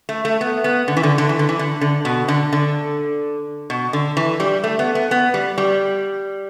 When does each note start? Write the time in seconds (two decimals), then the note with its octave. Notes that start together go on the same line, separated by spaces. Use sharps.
0.09 A3
0.25 A3
0.41 B3
0.64 B3
0.88 D3
0.97 E3
1.03 D3
1.18 D3
1.29 E3
1.39 D3
1.49 E3
1.59 D3
1.81 D3
2.05 B2
2.28 D3
2.53 D3
3.70 B2
3.93 D3
4.17 E3
4.40 G3
4.64 A3
4.79 B3
4.95 B3
5.11 B3
5.34 G3
5.58 G3